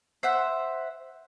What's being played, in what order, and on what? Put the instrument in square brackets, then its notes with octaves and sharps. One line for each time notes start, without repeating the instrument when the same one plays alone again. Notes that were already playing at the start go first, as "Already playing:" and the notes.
[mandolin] C5 E5 F#5